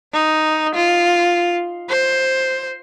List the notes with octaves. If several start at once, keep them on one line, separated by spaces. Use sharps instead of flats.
D#4
F4
C5